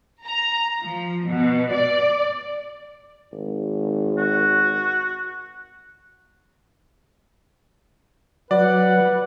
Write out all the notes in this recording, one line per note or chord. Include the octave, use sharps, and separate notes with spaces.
A#5
F3
B2
D5
G#1
F#4
F#3 B4 D5 F#5